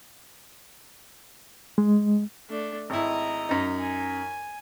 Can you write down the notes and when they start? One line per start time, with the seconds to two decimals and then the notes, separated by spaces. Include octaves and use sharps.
1.78 G#3
2.50 A3 D4
2.90 G#1 E4 D#5 A#5
3.49 F#2 D#4
3.80 G#5